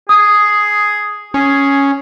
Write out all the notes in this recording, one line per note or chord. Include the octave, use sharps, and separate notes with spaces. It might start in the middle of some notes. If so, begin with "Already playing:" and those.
G#4 D#6
C#4 G#4